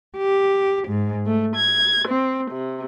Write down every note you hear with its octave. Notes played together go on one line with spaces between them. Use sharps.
G4
G#2
A3
G#6
C4
C3